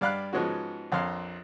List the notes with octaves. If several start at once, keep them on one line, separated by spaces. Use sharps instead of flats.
G2 D5 F5 B5 F#6
G#2 F3 G#3 B3 C#4 F#4
A#1 F2 C#5 F5 C6